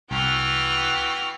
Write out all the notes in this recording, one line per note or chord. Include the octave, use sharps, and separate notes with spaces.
C2 E3 B3 F#4 G5 F6